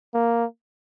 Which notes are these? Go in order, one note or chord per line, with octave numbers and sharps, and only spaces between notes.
A#3